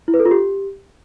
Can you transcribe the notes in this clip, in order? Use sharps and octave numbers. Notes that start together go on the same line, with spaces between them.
E4
B4
A4
F4
G4